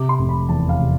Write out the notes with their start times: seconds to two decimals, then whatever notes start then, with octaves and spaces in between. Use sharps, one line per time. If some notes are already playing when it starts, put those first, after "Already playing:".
Already playing: C3 D6
0.09 C6
0.19 F1
0.29 B5
0.49 E2 A5
0.69 F5
0.79 C3